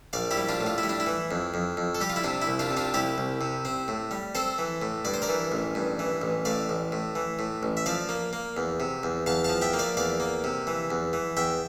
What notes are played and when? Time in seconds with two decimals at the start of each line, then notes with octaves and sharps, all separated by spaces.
0.13 A#1 D5 F5
0.31 E4 G4
0.37 G3
0.49 D4 F4
0.61 A2
0.66 F4
0.78 E4
0.83 G3
0.89 D4
1.00 E4
1.06 E3
1.31 F2
1.54 F2
1.77 F2
1.95 A4
2.01 G3 G4
2.10 F4
2.16 E4
2.24 C3 D4
2.42 E4
2.47 C2
2.59 D4 F4
2.71 C3
2.77 D4 F4
2.94 C2 E4 G4
3.18 C2
3.41 C3
3.65 C4
3.88 A2
4.11 G3
4.35 C4 A4 C5
4.58 E3
4.82 A2
5.05 G2 D5
5.14 C5
5.22 A#4 D5
5.29 E3
5.52 A1
5.75 G2
5.99 E3
6.22 A1
6.45 A2 D5 F5
6.69 A1
6.92 A2
7.15 E3
7.39 A2
7.63 A1
7.77 E5
7.86 F3 D5 F5
8.09 A#3
8.33 A#3
8.57 E2
8.80 C3
9.03 E2
9.26 E2 F5 A5
9.44 F3 F5 A5
9.61 E5 G5
9.73 A#3
9.79 D5 F5
9.97 E2 D5 F5
10.20 A#3
10.44 C3
10.67 E3
10.91 E2
11.13 E3
11.37 E2 E5 G5